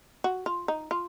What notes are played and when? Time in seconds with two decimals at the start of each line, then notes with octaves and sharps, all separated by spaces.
0.24 F#4
0.46 F4
0.68 D#4
0.91 F4